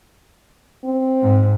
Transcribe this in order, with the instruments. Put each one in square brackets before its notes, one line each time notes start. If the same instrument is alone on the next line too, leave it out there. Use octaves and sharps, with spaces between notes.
[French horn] C4
[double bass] G#2